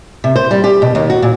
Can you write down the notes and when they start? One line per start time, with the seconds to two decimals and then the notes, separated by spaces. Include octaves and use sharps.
0.24 C3
0.36 C5
0.51 G3
0.64 G4
0.82 B2
0.95 D#2
1.10 F#4
1.22 A#2